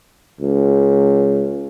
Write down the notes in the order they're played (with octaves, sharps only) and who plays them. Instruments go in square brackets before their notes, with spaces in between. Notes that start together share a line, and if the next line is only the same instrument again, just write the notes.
[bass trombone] C#2